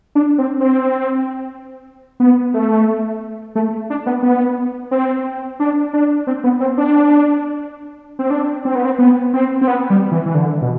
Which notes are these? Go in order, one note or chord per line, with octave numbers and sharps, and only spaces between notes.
D4
C4
C4
B3
A3
A3
D4
B3
B3
C4
D4
D4
C4
B3
C4
D4
C4
D4
C4
B3
C4
B3
C4
C4
B3
G3
E3
E3
D3
B2